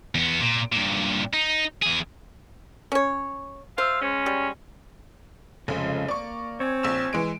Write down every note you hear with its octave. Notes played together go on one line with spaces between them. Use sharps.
E2 B3
A#2
G2 A#2
D#4
E2 G#4
C#4 C#5
F4 C5 E5 F5
G#3 C#4
G3
F1 C#3 F3 G#3
A#3 D5 C#6
C4 C#5 G#5
A#1 E6 E7
E3 G#3 D7